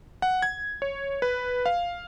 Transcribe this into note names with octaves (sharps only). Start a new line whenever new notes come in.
F#5
G#6
C#5
B4
F5